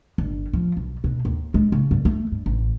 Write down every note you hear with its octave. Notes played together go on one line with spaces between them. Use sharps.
G1
F3
B1
B2
D#2
G#3
C#3
G2
A3
G2
A1